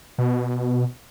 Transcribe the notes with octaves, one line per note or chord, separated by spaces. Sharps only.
B2